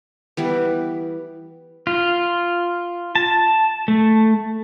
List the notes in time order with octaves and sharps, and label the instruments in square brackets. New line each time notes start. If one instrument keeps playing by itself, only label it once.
[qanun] E3 G3 B3
[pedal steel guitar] F4
A5
A3